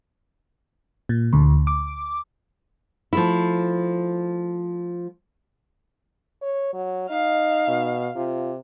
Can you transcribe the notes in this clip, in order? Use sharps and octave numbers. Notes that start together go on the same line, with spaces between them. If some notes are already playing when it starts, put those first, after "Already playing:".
A#2
D2
D6
F3 A3 E4
C#5
F#3
D#4 D#5 F5
B2
C3 F4